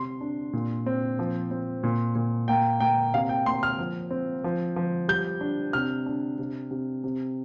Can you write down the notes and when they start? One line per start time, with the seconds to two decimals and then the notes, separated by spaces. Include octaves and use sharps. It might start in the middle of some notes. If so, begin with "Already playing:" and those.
Already playing: C3 C6
0.21 D4
0.53 A#2
0.86 C4
1.19 F3
1.51 C4
1.83 A#2
2.15 A#2
2.48 A#3 G5
2.80 A#3 G5
3.14 C3 F5
3.29 G5
3.46 A#3 C6
3.63 F6
3.79 F3
4.11 C4
4.44 F3
4.76 F3
5.08 G3 G6
5.41 D4
5.73 C3 F6
6.06 D4
6.39 C3
6.71 C3
7.04 C3